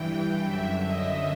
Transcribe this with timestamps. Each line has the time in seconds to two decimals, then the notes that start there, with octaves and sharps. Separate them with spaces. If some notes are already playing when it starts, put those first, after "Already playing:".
Already playing: G2 E3 G5
0.44 F#2 D3 E5
0.85 D#5